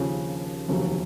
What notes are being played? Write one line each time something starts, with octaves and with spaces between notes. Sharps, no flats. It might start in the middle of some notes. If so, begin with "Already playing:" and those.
Already playing: D#2 C#3 F3
F1 D#2 C#3 F#3